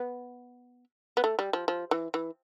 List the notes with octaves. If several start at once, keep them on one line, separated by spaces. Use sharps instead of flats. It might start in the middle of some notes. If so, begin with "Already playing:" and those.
Already playing: B3
B3
A3
G3
F3
F3
E3
E3